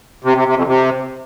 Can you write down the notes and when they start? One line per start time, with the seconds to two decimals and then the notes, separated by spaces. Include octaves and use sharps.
0.24 C3
0.35 C3
0.46 C3
0.56 F2
0.67 C3